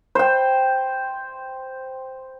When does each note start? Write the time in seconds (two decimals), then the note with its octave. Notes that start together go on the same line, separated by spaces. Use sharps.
0.15 C5 G5